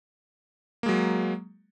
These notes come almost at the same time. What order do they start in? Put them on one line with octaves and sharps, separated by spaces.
A#3 G#3 F#3